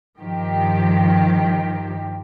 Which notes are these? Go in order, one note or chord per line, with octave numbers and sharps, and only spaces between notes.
G2 D#3 F3 G4